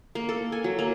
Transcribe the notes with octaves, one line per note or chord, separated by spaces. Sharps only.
A#3
A4
G#5
F#3
A#3